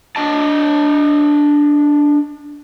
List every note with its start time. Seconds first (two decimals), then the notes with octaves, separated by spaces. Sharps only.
0.16 D4 D#5 A5